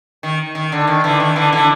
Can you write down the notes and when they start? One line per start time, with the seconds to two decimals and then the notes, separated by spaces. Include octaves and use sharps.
0.23 D#3
0.55 D#3
0.72 D3
0.87 D#3
1.04 D3 E3
1.20 D#3
1.36 D3 E3
1.53 D3 E3